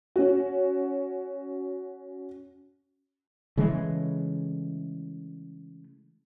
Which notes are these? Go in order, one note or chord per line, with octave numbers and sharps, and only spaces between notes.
C#4 F#4
C#3 E3 G#3 A3